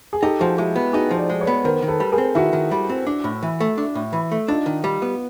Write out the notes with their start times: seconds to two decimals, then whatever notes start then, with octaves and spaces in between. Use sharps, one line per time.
0.13 G#4
0.22 D#4 G4 A4
0.40 F3 F#4 G#4
0.58 G#3 E4 F#4
0.76 B3
0.93 D#4 F#4 G#4
1.11 F3
1.17 C5 D5
1.30 G#3
1.41 B4 C#5
1.47 B3
1.64 D#3 A#4 C5
1.82 D#3
1.88 A4 B4
2.00 G3
2.12 G#4 A#4
2.18 C4
2.35 D#3 E4 F#4
2.53 D#3
2.71 G3
2.89 C4
3.07 D4
3.24 A2
3.43 E3
3.60 A3
3.78 D4
3.95 A2
4.13 E3
4.32 A3
4.48 D4 D#4 F4
4.66 D#3
4.84 G3
5.02 B3